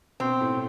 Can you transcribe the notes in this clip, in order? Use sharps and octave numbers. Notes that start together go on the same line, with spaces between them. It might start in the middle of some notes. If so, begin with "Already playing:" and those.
B2 B3 C4
A2 A3